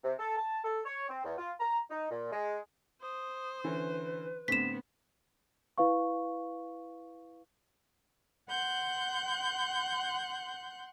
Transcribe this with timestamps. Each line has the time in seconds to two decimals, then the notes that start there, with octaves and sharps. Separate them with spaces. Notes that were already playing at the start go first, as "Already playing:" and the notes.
0.03 C3
0.18 A4
0.37 A5
0.64 A4
0.85 C#5
1.09 C4
1.24 E2
1.38 F4
1.59 A#5
1.90 D#4
2.10 A#2
2.31 G#3
3.02 C5 D#6
3.64 D3 E3 C#4 B4
4.48 A2 D3 B3 C4 B6 E7
5.78 E4 B4 F5 C#6
8.49 F#5 C6 F#6 G6